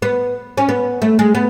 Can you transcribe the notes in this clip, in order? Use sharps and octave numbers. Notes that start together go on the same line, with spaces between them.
B3
C#4
B3
A3
G#3
B3